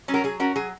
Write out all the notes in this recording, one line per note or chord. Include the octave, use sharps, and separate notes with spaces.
F#3 C#4
F#4 A#4
F#3 G#4
C#4 F#4 A#4
F#3 G#4